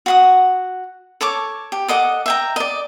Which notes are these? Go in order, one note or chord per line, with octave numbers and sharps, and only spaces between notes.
F#4 F#5 D#6
A4 C#5 A5 D6
G4
A4 D#5 F#5 D6
E5 G5 A#5
D5 D#5